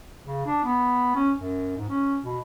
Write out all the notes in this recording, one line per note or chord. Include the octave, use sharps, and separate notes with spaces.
C#3
D4
B3
C#4
F#2
G#2
C#4
B2